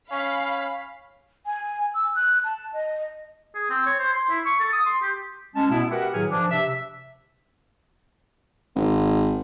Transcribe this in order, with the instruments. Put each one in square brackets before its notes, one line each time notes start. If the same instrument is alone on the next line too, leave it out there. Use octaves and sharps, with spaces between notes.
[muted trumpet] C#4 [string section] F5 B5
[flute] G#5
E6
F#6
A5
D#5
[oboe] G#4
C4
C#5
C5
C6
E4
C#6
A4
D#6
C6
G4
[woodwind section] G#3 C#4 A5
B2 B3 E4
F#4 G4 A#4 B4 E5 F#5
A2 D#3 F#3 G#4 G#5 F6
G2 F3 D4
C3 E5
[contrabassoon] G#1